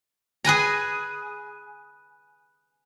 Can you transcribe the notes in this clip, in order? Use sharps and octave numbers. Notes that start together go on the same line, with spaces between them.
G#4 B4 G#5 A#5